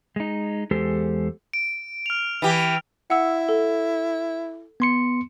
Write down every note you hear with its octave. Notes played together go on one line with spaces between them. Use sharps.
G#3 D#4
E2 G#3 G4 A4 C5
D7
F6 F7
E3 G4
E4 F#5 E6
A4
B3 C6 C#7